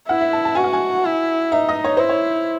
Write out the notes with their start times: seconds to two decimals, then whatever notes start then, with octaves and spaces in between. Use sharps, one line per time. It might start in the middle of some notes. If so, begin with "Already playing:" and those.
0.09 E4 F#5
0.21 E5
0.33 A5
0.45 A5
0.55 F#4 G#5
0.64 F#5
0.73 G#5
1.05 E4
1.52 D#4 E5
1.69 D#5
1.84 C#5
1.97 E4 C5
2.09 C#5